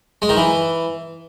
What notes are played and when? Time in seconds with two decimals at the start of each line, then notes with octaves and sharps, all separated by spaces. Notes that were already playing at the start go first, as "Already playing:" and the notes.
0.22 G#3
0.29 D#3
0.37 E3